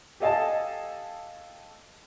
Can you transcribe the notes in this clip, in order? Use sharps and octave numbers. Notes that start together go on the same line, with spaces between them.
G4 A4 D#5 F5 G#5 A5